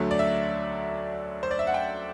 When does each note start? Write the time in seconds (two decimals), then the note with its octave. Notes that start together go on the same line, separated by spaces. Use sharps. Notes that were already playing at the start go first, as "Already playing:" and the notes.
Already playing: D2 D3 F#3 A3
0.11 D5
0.19 E5
1.43 C5
1.51 D5
1.59 E5
1.67 F#5
1.74 G5